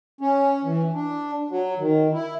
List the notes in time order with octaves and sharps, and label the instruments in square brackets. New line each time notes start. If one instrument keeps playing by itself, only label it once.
[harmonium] C#4
E3
D4
F#3
D#3
E4